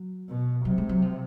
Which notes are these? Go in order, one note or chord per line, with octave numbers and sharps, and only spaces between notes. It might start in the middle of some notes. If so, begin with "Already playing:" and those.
Already playing: F#3
B2
C3 F#3
G#3
F#3
F3